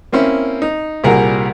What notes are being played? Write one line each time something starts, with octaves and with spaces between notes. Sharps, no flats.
A#3 C4 C#4 E4
D#4
C2 A#2 G3 G#4 A#4 F#5